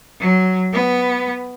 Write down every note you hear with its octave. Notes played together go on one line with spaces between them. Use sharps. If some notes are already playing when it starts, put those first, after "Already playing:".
F#3
B3